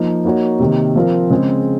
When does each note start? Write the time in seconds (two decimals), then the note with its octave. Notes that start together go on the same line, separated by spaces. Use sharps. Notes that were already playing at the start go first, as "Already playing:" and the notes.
Already playing: F3 A#3 D#4
0.25 A#3 D#4 F#4 C#5
0.60 C3 D#3 A#3
0.95 F3 C4 F4 A#4
1.30 C#3 G#3 C4